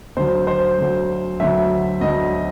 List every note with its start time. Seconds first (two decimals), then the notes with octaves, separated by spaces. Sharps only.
0.17 D2 D3 F#3 C5
0.47 C5
0.78 D2 D3 F#3
1.40 D2 D3 F#3 E5
2.01 D2 D3 F#3 D#5